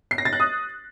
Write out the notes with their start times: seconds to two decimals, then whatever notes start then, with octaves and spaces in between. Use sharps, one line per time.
0.11 C7
0.18 A#6
0.25 A6
0.33 F#6
0.40 D#6